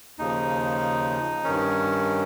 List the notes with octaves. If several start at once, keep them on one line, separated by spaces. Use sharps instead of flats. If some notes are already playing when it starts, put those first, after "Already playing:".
D#2 C#3 F3 D#4
G2 D#3 C#4